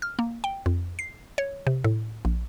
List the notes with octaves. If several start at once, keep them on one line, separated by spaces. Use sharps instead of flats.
F6
A#3
G5
F2
C7
C#5
C3
A2
A#1